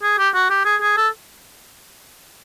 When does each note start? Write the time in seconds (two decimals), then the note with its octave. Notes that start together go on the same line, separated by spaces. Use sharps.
0.03 G#4
0.18 G4
0.34 F#4
0.50 G4
0.65 G#4
0.81 G#4
0.97 A4